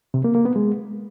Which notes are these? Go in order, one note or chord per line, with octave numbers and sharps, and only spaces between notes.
C3
A#3
A#3
B3
G#3